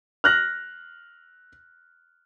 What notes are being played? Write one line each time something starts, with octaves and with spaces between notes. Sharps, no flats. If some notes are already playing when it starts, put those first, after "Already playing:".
F6 F#6 A#6